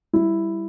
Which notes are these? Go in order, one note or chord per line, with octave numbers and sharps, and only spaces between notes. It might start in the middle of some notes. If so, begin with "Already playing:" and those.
G3 E4